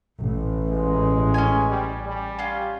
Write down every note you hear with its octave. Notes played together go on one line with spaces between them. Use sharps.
A1
G#3
C#4 G#5
G3
G3
C#4 F4